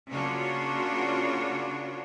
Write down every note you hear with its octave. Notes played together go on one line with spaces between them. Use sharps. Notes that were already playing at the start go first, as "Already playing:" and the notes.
C#3 A#3 D4 F4 F#4 C#5